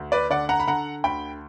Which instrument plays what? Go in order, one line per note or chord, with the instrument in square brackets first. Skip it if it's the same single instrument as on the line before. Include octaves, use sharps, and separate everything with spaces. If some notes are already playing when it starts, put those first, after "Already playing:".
Already playing: [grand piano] D2
B4 D5
D3 D5 F#5
F#5 A#5
B5
D3 F#5 A#5
D2 G5 B5